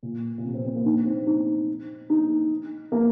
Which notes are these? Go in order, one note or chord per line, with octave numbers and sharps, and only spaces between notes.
A#2
A#2
C3
C4
C4
A#3
D#4
C4
D#4
D#4
A#3